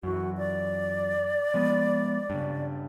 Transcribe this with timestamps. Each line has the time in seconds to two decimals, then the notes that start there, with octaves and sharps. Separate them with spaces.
0.03 F#2 E3 F#4
0.37 D5
1.54 F3 G#3 B3
2.30 G2 C#3